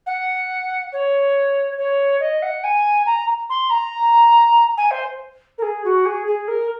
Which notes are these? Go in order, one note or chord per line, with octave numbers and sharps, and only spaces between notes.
F#5
C#5
C#5
D#5
F#5
G#5
A#5
C6
A#5
G#5
C5
A#4
G#4
F#4
G#4
G#4
A#4